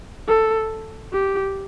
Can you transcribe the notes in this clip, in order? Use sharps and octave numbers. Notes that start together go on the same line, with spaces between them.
A4
G4